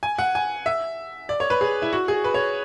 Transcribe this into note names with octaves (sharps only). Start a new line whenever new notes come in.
G#5
F#5
G#5
E5
D5
C#5
B4
G#4
E4
F#4
G#4
B4
C#5